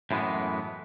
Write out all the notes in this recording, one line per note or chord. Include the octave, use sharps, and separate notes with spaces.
F#2 A2 E3 G#3 B3